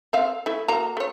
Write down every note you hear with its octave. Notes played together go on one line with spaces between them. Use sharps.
C4 E5 F5
A3 E4
A#3 F#4 A#5
A3 C#5